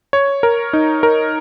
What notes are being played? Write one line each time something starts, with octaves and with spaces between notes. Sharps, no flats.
C#5
A#4
D#4
A#4